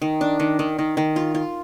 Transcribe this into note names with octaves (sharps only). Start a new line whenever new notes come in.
D#3
D4
D#3
D#3
D#3
D#3
F4
F4